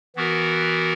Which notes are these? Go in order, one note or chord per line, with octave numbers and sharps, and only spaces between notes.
E3 B3 F#4 A#4